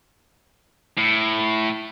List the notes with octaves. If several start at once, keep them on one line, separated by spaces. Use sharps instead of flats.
A2